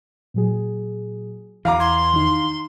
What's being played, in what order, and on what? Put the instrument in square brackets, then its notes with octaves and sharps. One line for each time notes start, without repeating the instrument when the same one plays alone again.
[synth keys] A#2 F#3 G#4
[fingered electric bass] E2 E3 [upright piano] F5 A#5 D6
[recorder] C6 [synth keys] G#6
[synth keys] D#3 D#4